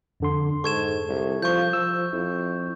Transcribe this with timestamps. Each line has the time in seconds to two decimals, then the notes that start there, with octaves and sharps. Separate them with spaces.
0.20 F2 D3 C6
0.64 G#2 A4 C#6 G#6 E7
1.09 C2
1.42 F3 C#6 G6
1.73 F3 E6
2.13 F2 E4